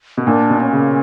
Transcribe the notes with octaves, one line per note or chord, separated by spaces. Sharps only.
B2
A#2 D4
B2
C#4
C#3